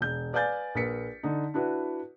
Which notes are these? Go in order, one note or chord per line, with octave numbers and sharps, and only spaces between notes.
E1 G6
B4 D5 F5 G#5 G6 A6
A#1 A#4 B4 B6 C#7
D3 D#4
D4 E4 F#4 B4